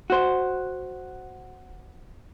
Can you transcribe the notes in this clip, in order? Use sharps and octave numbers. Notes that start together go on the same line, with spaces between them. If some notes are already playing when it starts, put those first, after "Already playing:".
F#4 C5